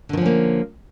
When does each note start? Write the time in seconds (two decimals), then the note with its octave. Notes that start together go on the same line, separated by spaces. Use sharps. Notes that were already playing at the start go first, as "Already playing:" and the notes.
0.09 D3
0.13 D#3
0.17 F3
0.22 C#4
0.26 A#3